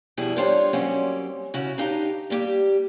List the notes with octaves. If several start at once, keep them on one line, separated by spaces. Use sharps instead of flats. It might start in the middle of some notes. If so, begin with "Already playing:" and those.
F2 B2 E3 G3 E4 G#4
G3 D4 F4 C5 C#5 F5
F#3 G3 A#3 C4 C#4
C#3 C#4 E4 F#4
D4 D#4 G4 B4 F5 A#5
G3 A#3 G4